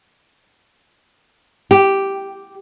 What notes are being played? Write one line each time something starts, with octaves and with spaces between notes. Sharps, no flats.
G4